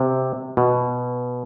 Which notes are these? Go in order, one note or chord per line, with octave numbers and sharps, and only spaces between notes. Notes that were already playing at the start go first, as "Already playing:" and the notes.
Already playing: C3
B2